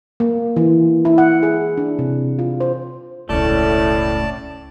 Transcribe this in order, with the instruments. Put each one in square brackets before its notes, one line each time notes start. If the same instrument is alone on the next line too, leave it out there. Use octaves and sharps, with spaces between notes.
[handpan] A#3
E3
E4
F#5
G#4
D4
C3
F4
C5
[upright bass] E1 C#2 [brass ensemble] A2 [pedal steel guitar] A3 C#4 [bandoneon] D5 A5